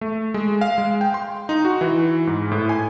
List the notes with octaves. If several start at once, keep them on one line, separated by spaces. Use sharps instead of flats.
A3
G#3
F5
G#3
G5
C6
D#4
F#4
E3
G#2
A2
G#5